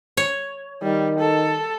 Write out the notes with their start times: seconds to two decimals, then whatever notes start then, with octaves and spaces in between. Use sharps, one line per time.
0.17 C#5
0.82 D#3 G3
1.19 A4